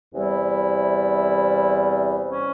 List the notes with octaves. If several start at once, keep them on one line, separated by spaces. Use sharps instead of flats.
E2 C3 G3 E4
C#4